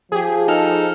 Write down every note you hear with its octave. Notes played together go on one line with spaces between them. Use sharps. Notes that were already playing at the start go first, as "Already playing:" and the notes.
F3 G4 G#4
D#4 A4 F6